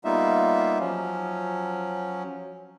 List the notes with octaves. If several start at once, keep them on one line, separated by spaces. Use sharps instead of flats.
G3 A#3 B3 D#4 F4 E5
F3 F#3 C#4